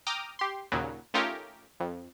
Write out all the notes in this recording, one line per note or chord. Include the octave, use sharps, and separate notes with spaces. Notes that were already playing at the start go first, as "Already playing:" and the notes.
G5 A#5 D6 D#6 F6
G4 C6
D#2 A#2 C#3 F#3
A3 C#4 D#4 F4 G4 A#4
F2